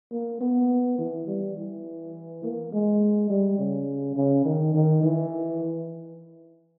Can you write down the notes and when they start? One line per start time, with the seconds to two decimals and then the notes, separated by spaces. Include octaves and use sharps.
0.12 A#3
0.41 B3
0.98 E3
1.27 G3
1.57 E3
2.43 A#3
2.73 G#3
3.30 G3
3.58 C#3
4.16 C#3
4.45 D#3
4.74 D#3
5.03 E3